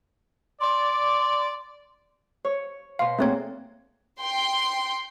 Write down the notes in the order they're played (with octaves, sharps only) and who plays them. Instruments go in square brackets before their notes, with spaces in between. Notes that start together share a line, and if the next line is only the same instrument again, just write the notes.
[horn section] D5 [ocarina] C6
[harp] C#5
[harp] B2 C6 [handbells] F5
[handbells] A3 C4 C#5 [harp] A#3 F#4 G#4
[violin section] G5 C6